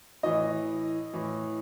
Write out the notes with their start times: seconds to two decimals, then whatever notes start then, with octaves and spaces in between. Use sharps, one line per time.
0.23 A2 E3 D#5
1.13 A2 E3